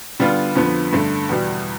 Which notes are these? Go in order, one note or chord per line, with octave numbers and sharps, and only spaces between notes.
D3 G3 B3 F4
F2 D3 F3 B3
G2 D3 A3
E2 B2 G3